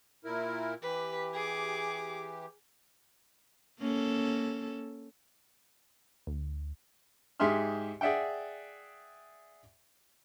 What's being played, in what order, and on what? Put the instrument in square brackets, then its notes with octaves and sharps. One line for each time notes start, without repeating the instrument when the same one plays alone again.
[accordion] A#2 E4 A#4
[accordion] E3 G4 [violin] B4
[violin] G#4 D6
[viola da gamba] A#3 C#4 A4
[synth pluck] D2
[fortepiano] G#2 G4 G#4 E5 C6 F6
G#4 D5 E5 F#5 G5